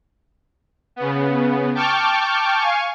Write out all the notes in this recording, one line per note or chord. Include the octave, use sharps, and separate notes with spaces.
C#3 B3
G5 A5 C#6 D6 F6 G6
F5 G#5 C#6